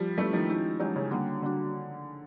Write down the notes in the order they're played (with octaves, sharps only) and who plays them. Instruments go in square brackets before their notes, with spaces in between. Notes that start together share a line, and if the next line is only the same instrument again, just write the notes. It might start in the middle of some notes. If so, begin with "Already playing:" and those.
Already playing: [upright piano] F3 G3
[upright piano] G3 A3 [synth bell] C#4 E4 G4 B4
[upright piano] D#3 F3
[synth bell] G#3 C#4 E4 G4
[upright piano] E3 F#3 [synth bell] G#3 C#4 E4 G4
[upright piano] C#3
[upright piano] D3 [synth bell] G3 A#3 D4 F#4
[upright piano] D3 [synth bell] G3 A#3 D4 F#4